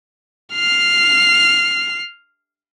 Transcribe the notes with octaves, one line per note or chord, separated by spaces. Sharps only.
F6 C7